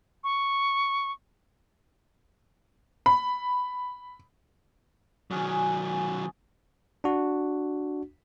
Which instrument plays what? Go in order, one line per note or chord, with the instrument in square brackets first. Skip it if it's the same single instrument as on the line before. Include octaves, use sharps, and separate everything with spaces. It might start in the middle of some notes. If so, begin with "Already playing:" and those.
[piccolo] C#6
[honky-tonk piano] B5
[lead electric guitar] D#3 F#3 [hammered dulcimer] C#4 G#4 D5
[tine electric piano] D4 F#4